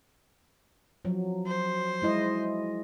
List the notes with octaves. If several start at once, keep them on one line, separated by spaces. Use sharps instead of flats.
F3 F#3
C5
G#3 E4 D#5